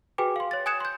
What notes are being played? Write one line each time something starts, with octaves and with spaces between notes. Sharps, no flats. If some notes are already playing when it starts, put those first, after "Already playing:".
F#4 G#4 B4 G5 G#5 D6
F5 C6
C#5 A6
G#5 D#6 F#6 G#6 C#7 E7
C6 G6